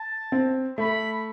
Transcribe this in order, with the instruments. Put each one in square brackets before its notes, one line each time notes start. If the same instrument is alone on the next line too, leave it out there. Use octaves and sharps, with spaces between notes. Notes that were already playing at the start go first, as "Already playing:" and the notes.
Already playing: [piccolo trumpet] A5
[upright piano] C4
[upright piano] A3 [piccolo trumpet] B5